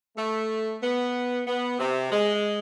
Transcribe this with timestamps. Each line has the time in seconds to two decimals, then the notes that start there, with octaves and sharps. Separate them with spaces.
0.17 A3
0.82 B3
1.47 B3
1.79 C3
2.12 G#3